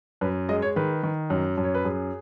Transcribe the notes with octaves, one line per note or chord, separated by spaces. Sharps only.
F#2 B4
G#3 D#5
C#5
D#3 B4
D#3
F#2
F#2
C#5
B4
F#2 G#4